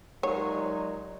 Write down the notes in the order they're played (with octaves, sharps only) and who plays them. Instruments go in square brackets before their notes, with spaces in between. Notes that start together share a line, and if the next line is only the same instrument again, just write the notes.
[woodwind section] A#2 F#3 G#3 [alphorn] D#4 [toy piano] G4 A#4 F#5 [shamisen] C#5